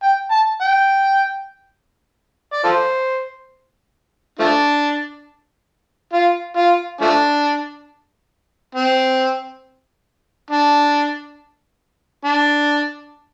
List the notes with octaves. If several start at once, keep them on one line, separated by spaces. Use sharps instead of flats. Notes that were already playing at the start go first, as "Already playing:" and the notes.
G5
A5
G5
D5
F4 A4 C5
F3 A3 D4
F4
F4
F3 A3 D4
C4
D4
D4